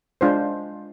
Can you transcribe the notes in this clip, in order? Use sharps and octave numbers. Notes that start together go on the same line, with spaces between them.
G#3 D4 F4 C5